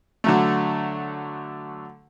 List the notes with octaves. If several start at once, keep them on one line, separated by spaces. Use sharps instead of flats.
D3 F#3 A3